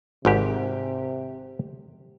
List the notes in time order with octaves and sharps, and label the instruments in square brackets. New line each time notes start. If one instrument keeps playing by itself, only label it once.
[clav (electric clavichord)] G#1 G#2 G4 [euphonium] C3